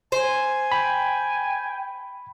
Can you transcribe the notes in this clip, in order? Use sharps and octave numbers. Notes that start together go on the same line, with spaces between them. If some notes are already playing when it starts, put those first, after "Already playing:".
C5 G#5
G5 B5